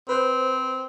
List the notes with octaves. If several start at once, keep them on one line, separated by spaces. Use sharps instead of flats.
C4 B4 C5